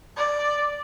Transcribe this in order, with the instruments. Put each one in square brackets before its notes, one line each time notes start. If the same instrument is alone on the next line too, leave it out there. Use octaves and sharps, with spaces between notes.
[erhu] D5